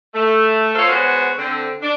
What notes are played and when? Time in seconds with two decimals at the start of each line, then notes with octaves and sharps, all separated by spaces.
0.14 A3
0.75 F4 A4 A#4 C5 C#5
0.88 G#3 B3 F#4 C5 C#5
1.38 D3 C4
1.82 D4